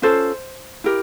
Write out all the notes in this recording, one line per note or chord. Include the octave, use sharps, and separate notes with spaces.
C#4 F4 A4 C5
E4 G4 A#4